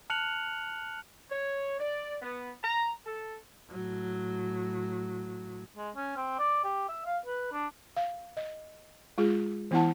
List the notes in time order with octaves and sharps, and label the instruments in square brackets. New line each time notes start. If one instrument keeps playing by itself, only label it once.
[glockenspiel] A5 F6 F#6 C#7 F7 F#7
[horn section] C#5
D5
B3
A#5
A4
[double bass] A2 F#3
[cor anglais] G#3
C#4
C4
D5
G4
E5
F5
B4
D4
[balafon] F5
D#5
G#3 F4 G#4
E3 B3 E4 F#5 A5